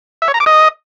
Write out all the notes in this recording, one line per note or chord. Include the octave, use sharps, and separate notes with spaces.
E5
C#5
A#5
D6
D#5